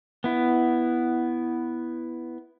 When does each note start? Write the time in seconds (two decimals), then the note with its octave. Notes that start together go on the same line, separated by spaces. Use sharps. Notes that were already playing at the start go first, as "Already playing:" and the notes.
0.24 B3 E4